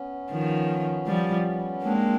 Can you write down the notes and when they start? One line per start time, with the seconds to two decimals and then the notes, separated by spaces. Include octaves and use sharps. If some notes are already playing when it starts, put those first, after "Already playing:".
Already playing: B3 C#4
0.31 D#3 F3
1.07 F3 G3
1.84 G#3 A#3 C4 D4